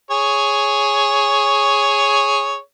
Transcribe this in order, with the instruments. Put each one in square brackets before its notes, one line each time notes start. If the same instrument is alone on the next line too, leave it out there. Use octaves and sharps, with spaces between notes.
[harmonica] G#4 C#5